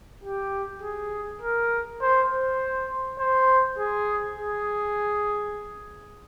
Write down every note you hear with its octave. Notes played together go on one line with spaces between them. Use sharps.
G4
G#4
A#4
C5
C5
C5
G#4
G#4